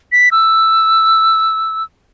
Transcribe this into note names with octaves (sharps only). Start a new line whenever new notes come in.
B6
E6